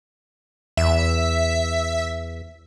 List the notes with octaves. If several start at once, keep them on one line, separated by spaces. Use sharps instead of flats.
E2 E5